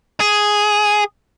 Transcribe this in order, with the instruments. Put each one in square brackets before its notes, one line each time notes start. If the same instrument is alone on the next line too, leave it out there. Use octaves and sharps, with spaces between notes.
[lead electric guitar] G#4